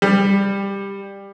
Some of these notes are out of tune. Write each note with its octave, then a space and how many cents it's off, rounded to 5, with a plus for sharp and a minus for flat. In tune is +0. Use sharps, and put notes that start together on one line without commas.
G3 +15